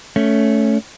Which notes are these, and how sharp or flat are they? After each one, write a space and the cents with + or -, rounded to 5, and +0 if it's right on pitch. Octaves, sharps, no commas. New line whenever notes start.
A3 +0 C#4 +10